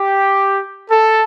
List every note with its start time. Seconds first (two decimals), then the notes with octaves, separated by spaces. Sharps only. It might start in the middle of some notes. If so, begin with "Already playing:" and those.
Already playing: G4
0.90 A4